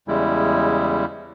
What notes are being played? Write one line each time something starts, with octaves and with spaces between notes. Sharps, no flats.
E2 C#3 G3 G#3 E4